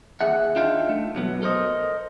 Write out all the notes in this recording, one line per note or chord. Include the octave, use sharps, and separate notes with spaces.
D#2 G#4 E5 F#5
D4 D#4 F4 E5 F5 G5
A3
B1 F#3 B3
A4 A#4 C5 D#5